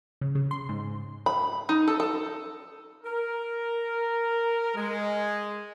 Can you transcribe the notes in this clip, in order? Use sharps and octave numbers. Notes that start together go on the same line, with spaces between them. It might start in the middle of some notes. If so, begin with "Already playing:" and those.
C#3
C#3
C6
G#2
B5
D#4
A4
A4
A#4
G#3